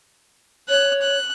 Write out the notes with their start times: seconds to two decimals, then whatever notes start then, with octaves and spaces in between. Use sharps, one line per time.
0.69 C#5 F#6
1.02 F#6